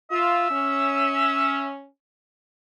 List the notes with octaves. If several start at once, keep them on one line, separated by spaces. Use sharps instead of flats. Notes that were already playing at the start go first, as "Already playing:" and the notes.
F4 E5
C#4